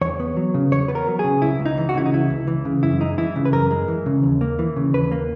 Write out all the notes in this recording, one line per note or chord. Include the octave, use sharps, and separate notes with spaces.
E2 C#5
B3
F#3
C#3
E2 C#5
B3 B4
A#4
F#3
C#3 G#4
C#2 E4
C#2
D#4
E3
F#4
C#3 E4
D#4
C#2 E4
C#2
E3
C#3
F#2 E4
G#3 D#4
E3 E4
C#3
B4
F#2 A#4
G#3
E3
C#3
D#2
A#3
E3
C#3
D#2 B4
A#3